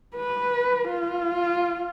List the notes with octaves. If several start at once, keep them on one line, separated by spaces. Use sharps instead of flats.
B4
F4